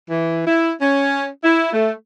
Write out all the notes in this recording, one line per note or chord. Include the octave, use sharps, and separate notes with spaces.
E3
E4
C#4
E4
A3